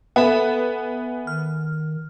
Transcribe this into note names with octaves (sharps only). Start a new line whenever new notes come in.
B3 A4 E5 G#5
D#3 F6